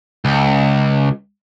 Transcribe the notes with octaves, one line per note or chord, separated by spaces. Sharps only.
C#2